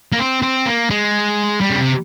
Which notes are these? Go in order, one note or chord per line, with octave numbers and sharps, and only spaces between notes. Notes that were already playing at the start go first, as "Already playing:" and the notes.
A#3
C4
C4
A#3
G#3
G3
C#3
C3